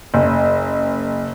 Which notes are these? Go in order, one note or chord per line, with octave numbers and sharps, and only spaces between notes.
F#1